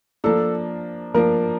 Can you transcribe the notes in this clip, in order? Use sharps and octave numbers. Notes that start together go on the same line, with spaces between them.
F3 A#3 D4 A4
F3 A#3 D4 A#4